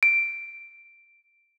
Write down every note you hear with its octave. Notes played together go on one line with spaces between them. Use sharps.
D7